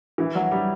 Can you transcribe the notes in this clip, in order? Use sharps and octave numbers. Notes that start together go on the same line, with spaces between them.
E3
F#3
G3